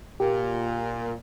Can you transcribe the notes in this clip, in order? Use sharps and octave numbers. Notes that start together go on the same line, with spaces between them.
A#2 G4